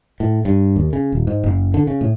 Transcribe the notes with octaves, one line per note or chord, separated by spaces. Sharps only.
A2
G2
D#2
C#3
D#1
G#2
F#1
D3
C#3
A2